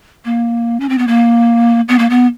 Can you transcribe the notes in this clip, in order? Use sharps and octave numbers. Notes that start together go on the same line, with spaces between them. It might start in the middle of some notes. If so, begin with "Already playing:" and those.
A#3
C#4
C4
B3
A#3
B3
A#3
B3